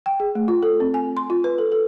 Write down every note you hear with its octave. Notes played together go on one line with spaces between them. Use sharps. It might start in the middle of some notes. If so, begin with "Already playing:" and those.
G5
G#4
A3
F4
A4
C4
G#5
C6
F4
B4
A4
A4